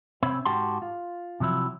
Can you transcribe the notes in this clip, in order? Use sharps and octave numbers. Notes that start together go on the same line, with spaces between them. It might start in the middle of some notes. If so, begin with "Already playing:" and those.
C3 C4 C#4 C#5 E5 B5
G#2 F#4 G4 G5 A5 C6
F4
C3 F3 F#3 E4